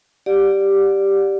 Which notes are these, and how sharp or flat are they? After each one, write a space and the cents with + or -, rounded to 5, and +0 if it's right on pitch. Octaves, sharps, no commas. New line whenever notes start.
G4 +0 D5 +0 F#5 -35